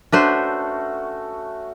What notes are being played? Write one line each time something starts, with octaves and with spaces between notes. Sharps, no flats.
A3 C#4 D4 F#4 B4 C5